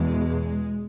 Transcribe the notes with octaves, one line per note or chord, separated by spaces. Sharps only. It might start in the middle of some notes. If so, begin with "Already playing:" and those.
Already playing: E2 B2 G#3